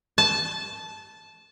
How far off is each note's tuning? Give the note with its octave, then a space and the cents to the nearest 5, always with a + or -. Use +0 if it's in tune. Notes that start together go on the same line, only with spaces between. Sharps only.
A5 -15